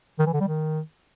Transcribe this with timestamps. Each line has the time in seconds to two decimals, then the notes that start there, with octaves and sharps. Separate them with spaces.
0.19 D#3
0.26 E3
0.33 D3
0.41 G3
0.48 D#3